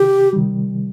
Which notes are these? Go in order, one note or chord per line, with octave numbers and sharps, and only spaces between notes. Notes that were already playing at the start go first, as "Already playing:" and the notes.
Already playing: C3 D#3 G4
C3 D#3 G3